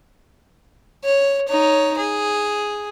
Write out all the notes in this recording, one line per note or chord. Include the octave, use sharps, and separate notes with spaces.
C#5
D#4 C#5
G#4